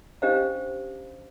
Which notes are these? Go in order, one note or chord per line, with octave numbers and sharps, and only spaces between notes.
C#4 D4 G4 C5 D#5 F5